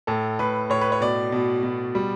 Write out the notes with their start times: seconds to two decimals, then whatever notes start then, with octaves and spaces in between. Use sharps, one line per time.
0.07 A2 A4
0.39 A2 B4
0.70 A2 C#5
0.81 B4
0.92 C#5
1.01 B2 D5
1.32 B2
1.63 B2
1.95 G3